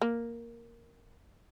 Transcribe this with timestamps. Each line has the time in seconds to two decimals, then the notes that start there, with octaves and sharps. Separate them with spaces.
0.02 A#3